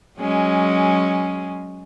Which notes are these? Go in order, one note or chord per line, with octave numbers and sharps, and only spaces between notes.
F#3 G#3 C#4